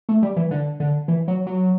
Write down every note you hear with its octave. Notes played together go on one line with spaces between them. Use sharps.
A3
G3
E3
D3
D3
E3
F#3
F#3